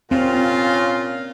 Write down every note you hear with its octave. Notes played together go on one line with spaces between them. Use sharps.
A#2 C4 C#4 F4